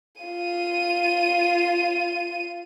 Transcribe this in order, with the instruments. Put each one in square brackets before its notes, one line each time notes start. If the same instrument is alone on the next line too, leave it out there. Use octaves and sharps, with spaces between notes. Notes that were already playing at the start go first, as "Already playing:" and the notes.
[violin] F4 D#7